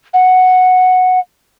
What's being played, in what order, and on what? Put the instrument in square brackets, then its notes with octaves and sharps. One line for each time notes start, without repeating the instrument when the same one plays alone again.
[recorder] F#5